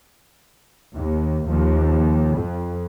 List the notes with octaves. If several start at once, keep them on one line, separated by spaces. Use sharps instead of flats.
D#2
D#2 F3
F2